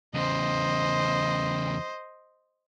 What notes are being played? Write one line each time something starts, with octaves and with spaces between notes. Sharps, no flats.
E2 C#3 C5 D#5